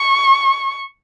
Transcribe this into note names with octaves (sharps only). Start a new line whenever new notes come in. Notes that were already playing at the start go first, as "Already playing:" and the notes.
Already playing: C#6